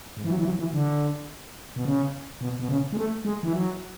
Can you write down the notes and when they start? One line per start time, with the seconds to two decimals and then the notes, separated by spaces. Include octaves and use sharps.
0.17 G#2
0.24 E3
0.30 F#3
0.38 E3
0.45 F#3
0.59 E3
0.73 D3
1.76 B2
1.85 C#3
2.41 B2
2.59 B2
2.69 C#3
2.93 G#3
2.97 A3
3.25 G#3
3.43 E3
3.53 F#3